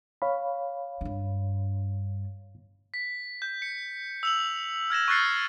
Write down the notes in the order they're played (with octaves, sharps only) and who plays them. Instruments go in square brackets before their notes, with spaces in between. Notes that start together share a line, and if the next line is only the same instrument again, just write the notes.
[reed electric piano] C#5 F5 B5
[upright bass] G2 D4
[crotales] B6
G6
C#7
E6 F7 F#7
F6 G#6 A#6 E7
C#6 F6 F#6 A6 C7 C#7